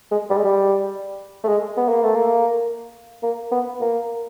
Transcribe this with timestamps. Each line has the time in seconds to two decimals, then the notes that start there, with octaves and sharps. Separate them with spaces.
0.11 G#3
0.30 G3
0.37 G#3
0.44 G3
1.44 A3
1.48 G#3
1.77 B3
1.89 A#3
2.03 A3
2.15 A#3
3.23 A#3
3.51 B3
3.81 A#3